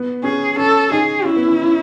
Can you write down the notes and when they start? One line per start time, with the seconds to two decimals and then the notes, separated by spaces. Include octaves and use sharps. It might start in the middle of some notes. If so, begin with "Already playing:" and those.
Already playing: B3
0.23 C#4 G#4
0.57 C#4 A4
0.92 D#4 G#4
1.25 C#4 E4
1.37 B3
1.48 C#4
1.59 C#4